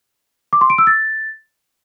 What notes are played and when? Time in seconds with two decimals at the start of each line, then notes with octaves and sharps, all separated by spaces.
0.53 D6
0.61 C6
0.70 D7
0.78 E6
0.87 A6